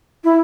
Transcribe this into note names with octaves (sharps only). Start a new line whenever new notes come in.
E4